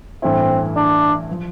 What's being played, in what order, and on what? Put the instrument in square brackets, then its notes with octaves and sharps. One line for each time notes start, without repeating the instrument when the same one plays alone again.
[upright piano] A1 G2 E3 A3 E4 [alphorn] C4
[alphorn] D4
[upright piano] F3